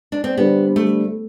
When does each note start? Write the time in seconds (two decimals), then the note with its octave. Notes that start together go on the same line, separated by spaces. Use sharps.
0.12 D4
0.24 C4
0.37 D3 G3 B3 D4 G4 C5
0.76 A3